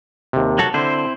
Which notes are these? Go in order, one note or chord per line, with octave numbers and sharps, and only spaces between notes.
D#2 C3
F#3 F#4 A4
D3 C4 E4 C5